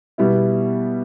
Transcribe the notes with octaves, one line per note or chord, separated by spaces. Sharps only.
B2 G3 B3 E4